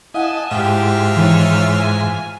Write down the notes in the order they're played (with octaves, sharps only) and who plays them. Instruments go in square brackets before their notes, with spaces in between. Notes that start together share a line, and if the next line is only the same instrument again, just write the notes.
[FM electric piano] E4 F5 F#5 [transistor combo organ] D#5 [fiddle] G#5 A5
[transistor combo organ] G#2 [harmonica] F4 E5 F6 [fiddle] G4
[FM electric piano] D#3 E3 [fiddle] D#4 C#5
[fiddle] G#5